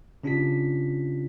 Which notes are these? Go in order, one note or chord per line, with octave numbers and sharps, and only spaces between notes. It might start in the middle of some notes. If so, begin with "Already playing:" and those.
C#3 C#4 D4 F4 G4 B6